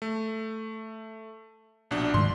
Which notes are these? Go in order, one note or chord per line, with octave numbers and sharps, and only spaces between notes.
A3
A#1 B2 D4
G#2 D#3 G#3 C6